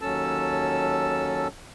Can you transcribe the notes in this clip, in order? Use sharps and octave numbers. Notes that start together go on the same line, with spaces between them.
D#2 F#3 C#4 A4 A5 E6